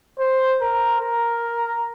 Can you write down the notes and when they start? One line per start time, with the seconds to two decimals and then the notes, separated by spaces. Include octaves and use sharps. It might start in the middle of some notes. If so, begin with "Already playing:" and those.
0.20 C5
0.61 A#4
1.01 A#4